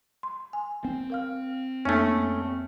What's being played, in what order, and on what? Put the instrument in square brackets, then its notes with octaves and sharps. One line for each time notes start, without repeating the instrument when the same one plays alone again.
[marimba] C6
G#5
[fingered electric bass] C4
[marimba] A#4 F5 F6
[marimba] F2 A#3 E5 [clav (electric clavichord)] A3 C#4